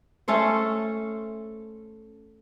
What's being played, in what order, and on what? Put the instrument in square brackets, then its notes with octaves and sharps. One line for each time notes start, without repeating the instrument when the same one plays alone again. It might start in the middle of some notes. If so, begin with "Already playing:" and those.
[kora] A3 C#4 A4 C5